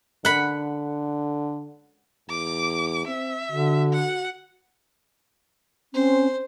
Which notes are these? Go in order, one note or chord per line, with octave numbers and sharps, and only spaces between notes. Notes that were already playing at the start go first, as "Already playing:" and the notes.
D3 F#5 B5
E2 D6
C4 E5
D3 F#4
F#5
C4 C#4 C5